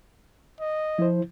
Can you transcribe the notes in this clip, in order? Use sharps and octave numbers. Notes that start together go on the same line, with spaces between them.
D#5
F3 E4 C5